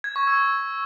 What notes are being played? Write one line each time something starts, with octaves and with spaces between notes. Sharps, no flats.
G#6
C#6
E6